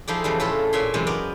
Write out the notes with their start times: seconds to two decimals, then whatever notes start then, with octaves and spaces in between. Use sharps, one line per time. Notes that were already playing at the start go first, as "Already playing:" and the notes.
0.08 F3 D#4 E4 G#4 A4 D5
0.24 C#3 E3 F3 G3
0.40 A2 C#4 E4 F4 A4 A5
0.73 A#2 C#5 E5 G#5 C6
0.94 F#2 C3 E3 G#3
1.07 B3 A#4 D5 D#5